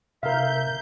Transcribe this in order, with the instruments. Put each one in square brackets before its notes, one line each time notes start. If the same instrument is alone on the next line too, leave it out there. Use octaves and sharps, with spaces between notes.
[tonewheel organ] C3 [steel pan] A#4 F5 [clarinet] E5 [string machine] G6